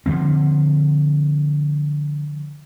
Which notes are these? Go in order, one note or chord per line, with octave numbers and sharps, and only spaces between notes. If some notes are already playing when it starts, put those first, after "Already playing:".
D3 D#3 F3 C4